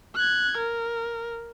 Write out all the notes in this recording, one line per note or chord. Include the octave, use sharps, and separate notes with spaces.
F#6 G#6
A#4